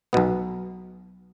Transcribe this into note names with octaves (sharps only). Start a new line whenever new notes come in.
B1 B2 B3